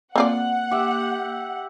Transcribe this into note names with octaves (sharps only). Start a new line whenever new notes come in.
A#3 C4 F4 D5 F#5
G4 E5